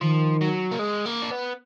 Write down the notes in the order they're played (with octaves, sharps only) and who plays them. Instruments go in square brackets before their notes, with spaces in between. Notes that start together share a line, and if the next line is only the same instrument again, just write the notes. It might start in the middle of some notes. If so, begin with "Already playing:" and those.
[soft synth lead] D#3 [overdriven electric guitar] F3
[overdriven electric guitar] F#3
A#3
G#3
A#3
D4
B3